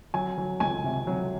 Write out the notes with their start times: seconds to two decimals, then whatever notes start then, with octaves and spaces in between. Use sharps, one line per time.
0.14 F#3 G#5
0.38 F#3
0.60 C#2 G#5
0.84 C3
1.07 F#3